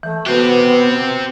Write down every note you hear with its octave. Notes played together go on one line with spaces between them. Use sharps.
E3 A3
B3 C4 F#4 G4